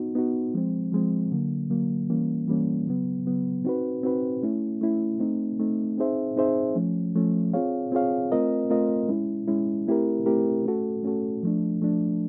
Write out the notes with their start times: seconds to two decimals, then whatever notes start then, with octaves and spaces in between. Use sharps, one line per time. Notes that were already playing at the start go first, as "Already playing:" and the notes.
Already playing: B3 D#4 F#4
0.15 B3 D#4 F#4
0.54 F3 G#3 C4
0.92 F3 G#3 C4
1.32 D3 F#3 A#3
1.70 D3 F#3 A#3
2.10 E3 G3 A#3 C#4
2.48 E3 G3 A#3 C#4
2.87 C#3 F#3 B3
3.26 C#3 F#3 B3
3.65 C4 D#4 F#4 B4
4.03 C4 D#4 F#4 B4
4.43 A3 C#4 E4
4.81 A3 C#4 E4
5.20 A3 C4 D#4
5.59 A3 C4 D#4
5.98 C4 D#4 G#4 C5 E5
6.36 C4 D#4 G#4 C5 E5
6.75 F3 A3 C#4
7.15 F3 A3 C#4
7.54 C4 F4 G#4 C#5 F5
7.92 C4 F4 G#4 C#5 F5
8.32 A3 C4 F4 A#4 D#5
8.70 A3 C4 F4 A#4 D#5
9.09 G#3 C#4 E4
9.48 G#3 C#4 E4
9.87 A3 C4 E4 G4 A#4
10.26 A3 C4 E4 G4 A#4
10.65 A3 C#4 F#4 A4
11.03 A3 C#4 F#4 A4
11.43 F3 A3 D4
11.81 F3 A3 D4